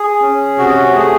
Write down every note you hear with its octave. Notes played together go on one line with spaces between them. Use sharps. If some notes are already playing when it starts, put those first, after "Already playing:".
Already playing: G#4
C#4
C3 F#4
A3 G#4